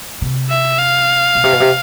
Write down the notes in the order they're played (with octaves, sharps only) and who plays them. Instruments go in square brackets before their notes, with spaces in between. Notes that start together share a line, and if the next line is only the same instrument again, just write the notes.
[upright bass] C3
[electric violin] E5
F5
[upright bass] B2
C3
B2
C3